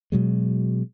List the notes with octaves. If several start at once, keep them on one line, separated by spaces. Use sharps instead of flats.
B2 F#3 G#3